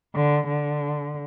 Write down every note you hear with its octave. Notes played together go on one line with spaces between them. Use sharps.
D3
D3